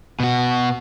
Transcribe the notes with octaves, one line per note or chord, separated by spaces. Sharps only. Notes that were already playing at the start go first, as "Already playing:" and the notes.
B2 F#4